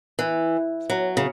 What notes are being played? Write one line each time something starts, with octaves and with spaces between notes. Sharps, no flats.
E3
F#3
C#3